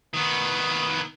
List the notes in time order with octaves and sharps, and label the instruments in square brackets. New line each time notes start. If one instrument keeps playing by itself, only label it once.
[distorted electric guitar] D#3 B3